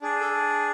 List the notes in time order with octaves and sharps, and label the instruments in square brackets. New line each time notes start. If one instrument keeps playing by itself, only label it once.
[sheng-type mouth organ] D4 G#4
A4